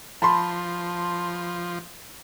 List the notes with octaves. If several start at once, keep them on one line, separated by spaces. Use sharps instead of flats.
F3 A5 B5 C6